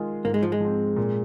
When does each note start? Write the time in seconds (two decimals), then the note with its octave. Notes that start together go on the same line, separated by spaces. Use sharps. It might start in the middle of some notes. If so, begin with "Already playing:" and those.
Already playing: D#3 G#3 F4 G#4
0.24 G#2 A#3
0.34 G#3
0.43 F3
0.52 G#3
0.60 F3 C4
0.96 A#2